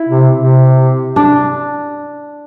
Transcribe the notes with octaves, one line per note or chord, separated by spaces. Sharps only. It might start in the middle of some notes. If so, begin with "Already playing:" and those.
Already playing: E4
C3
C3
D4